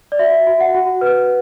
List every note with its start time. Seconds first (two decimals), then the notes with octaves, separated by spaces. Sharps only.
0.12 D5
0.19 F#4 E5
0.47 F#4
0.60 F#5
0.74 F#4
1.01 B4